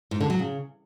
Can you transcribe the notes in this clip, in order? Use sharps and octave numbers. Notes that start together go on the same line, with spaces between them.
G#2
D3
F#3
C#3